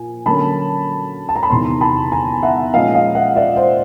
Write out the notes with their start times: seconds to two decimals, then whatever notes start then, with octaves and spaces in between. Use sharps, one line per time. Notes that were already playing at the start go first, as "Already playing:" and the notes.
Already playing: A#2 F3 G#5
0.26 D3 F#3 A#3 C#4 A5 B5
1.29 A5
1.36 A#5
1.43 B5
1.50 E2 C3 D#3 A#5 C6
1.81 A5 B5
2.12 G#5 A#5
2.43 E5 F#5
2.74 A#2 F3 G#3 C#4 D#5 F5
2.95 D#5 F5
3.15 E5 F#5
3.36 D5 E5
3.56 C5 D5